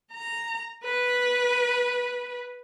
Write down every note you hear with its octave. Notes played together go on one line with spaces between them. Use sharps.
A#5
B4